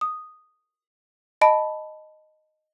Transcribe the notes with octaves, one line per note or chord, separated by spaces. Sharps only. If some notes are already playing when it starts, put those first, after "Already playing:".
D#6
D#5 A5 B5 D7